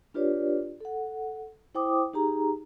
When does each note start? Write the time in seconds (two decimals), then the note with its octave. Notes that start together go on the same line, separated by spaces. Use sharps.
0.14 D4 F4 G4 B4 C#5 D5
0.81 A4 F#5
1.75 E4 C5 G5 D6 D#6
2.13 D#4 G4 G#4 A#5